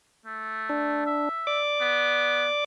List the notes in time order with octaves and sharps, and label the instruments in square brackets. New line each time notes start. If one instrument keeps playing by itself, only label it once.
[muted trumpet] A3
[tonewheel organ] D4
[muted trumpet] E5
[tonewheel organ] D5 D6
[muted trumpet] B3